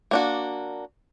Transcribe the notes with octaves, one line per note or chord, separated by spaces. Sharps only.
A#3 D4 F#4